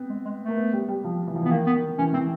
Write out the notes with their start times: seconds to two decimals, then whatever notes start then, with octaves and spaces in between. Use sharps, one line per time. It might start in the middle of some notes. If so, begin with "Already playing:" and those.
Already playing: B3 C4
0.10 G#3
0.25 G#3
0.42 A3
0.48 A#3
0.57 B3
0.73 G3
0.88 G3
1.04 F3
1.27 E3
1.35 F3
1.43 E3
1.45 B3
1.51 D#3 A#3
1.67 B3
1.74 D#3
1.99 E3 C#4
2.14 E3 C4